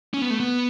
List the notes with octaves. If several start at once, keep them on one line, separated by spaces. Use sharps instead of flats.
C#4
B3
A3
B3